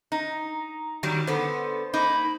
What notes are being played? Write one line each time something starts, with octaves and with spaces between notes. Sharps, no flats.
D#4 A#5
D#3 F#3 G3
D3 B3 A4 C5
A#3 D#4 B5